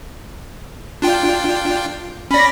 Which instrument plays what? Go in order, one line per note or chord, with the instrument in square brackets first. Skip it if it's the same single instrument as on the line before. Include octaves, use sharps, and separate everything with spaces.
[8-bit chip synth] D4 F4 G5
[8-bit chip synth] C#4 D5 [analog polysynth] B5 A#6